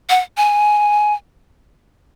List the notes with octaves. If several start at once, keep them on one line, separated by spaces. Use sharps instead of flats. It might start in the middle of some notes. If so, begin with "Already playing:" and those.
F#5
G#5